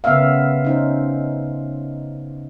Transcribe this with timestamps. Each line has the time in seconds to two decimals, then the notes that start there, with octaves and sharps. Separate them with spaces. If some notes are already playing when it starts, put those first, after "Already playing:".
0.04 C#3 B3 C#4 A#4 E5 F5
0.64 C#4 D#4 C5